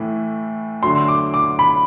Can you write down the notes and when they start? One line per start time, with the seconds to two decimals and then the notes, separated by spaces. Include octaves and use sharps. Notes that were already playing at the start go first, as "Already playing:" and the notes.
Already playing: A2 E3 A3
0.83 D3 F#3 A3 C6
1.08 D6
1.34 D6
1.59 B5